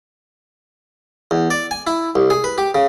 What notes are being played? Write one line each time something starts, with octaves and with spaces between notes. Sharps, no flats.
E2
D5
G#5
E4
C2
G#4
B4
G4
C#3